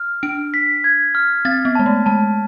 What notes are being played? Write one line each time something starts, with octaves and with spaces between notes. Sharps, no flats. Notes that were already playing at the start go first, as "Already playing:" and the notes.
Already playing: F6
D4 D7
B6
G#6
F6
C4 A6
B3
G#3 A5
A3
G#3 A5